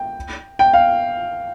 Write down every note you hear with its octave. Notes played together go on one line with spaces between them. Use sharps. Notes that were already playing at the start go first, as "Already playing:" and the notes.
Already playing: G5
G5
F5